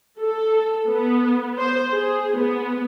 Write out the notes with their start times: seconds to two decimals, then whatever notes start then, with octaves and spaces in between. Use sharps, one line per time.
0.19 A4
0.88 B3
1.58 C5
1.93 G#4
2.38 B3